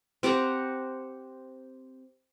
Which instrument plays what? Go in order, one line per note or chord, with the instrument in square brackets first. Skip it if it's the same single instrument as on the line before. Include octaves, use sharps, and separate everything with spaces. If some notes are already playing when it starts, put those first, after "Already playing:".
[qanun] C4 G4 F#5 A#5